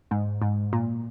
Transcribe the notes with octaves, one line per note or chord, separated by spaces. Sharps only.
G#2
G#2
A#2